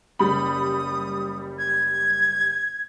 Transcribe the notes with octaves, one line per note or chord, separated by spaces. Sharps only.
F#1 G3 B5 D#6
G#6